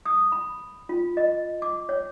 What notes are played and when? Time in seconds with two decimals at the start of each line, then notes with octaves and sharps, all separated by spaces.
0.05 D#6
0.32 B5
0.89 F4
1.17 D#5
1.62 D6
1.89 C#5